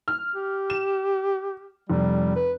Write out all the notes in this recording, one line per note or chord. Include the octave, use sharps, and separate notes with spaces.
F6
G4
E7
F1 G3
B4